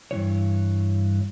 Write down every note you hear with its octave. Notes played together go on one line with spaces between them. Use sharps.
G2 D#3 E3 C#5